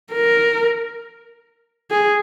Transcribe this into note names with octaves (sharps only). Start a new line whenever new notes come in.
A#4
G#4